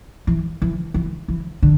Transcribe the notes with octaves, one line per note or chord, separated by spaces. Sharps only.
E3
E3
E3
E3
D3